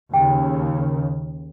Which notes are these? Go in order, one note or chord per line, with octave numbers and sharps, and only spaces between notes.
D#2 C#3 G5